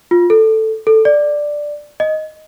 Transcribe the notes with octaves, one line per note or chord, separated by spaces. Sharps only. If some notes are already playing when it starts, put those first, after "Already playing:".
F4
A4
A4
D5
D#5